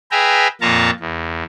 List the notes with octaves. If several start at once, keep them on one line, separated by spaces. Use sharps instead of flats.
G#4 B4 E5 G5 G#5 A#5
F2 A#2 F4 A5 A#5 C#6
E2